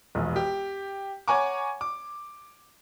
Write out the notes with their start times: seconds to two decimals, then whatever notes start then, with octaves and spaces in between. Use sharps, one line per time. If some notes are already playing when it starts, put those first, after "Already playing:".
0.15 E1 A#1
0.36 G4
1.28 C#5 F#5 G#5 A#5 C#6 D6
1.81 D6